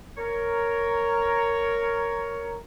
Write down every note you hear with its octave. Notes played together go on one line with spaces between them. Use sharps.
A#4 C#5